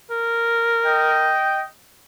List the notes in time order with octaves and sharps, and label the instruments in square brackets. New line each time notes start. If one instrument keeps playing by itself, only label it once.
[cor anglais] A#4
[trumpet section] D#5 G5